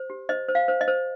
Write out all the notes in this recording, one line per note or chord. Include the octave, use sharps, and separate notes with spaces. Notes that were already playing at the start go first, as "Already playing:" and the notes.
Already playing: C5
G4
C5 D#5
C5
F5
C5
D#5
C5